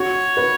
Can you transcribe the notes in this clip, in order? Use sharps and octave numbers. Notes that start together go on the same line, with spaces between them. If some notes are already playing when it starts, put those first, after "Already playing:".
Already playing: F#4 C#5
B4